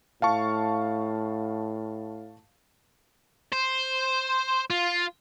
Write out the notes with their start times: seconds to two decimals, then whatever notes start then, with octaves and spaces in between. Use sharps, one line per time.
0.22 A2 F5 A5 C#6
3.53 C5
4.70 F4